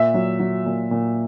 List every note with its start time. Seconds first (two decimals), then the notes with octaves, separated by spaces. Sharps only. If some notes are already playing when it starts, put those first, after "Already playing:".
Already playing: A#2 E5
0.14 F#3
0.40 F#3
0.66 A#2
0.91 A#2